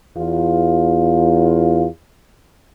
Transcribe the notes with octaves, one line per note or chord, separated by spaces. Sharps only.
E2 F4